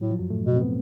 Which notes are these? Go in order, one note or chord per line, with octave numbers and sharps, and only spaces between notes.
A2 F#3
F3
F#2 F#3
A2 A3
B2
C4
B2 B3